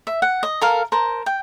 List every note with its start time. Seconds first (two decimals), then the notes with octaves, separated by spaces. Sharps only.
0.07 E5
0.22 F#5
0.43 D#5
0.61 A4 A#4 F5
0.92 A#4 C5 A5
1.26 G5